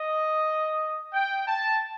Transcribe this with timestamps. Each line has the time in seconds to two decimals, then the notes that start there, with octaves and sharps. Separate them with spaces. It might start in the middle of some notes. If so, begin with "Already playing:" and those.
Already playing: D#5
1.13 G5
1.47 A5